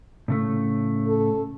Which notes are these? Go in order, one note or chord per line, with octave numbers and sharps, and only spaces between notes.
A2 C#3 A3
A4